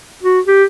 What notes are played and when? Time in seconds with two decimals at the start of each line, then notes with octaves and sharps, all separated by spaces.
0.23 F#4
0.47 G4